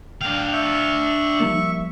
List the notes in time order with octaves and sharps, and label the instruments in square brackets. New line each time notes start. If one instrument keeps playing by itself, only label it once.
[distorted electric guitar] D4 F5 [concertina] G5
[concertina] E5 C#6 [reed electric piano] G6
[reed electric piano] F3 G3 A#3